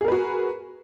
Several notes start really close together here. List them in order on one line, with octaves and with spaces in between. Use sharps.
G#4 A#4 B4 F#4